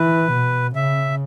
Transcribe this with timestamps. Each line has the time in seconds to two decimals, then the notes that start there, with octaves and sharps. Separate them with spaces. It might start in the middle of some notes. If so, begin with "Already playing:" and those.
Already playing: E3 B4
0.32 B2
0.75 C#3 E5